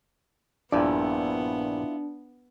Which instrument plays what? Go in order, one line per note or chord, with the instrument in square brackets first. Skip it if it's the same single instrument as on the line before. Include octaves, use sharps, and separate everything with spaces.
[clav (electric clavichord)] A#1 G2 A#2 [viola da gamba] B3 [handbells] D4 [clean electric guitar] E4 F4 D5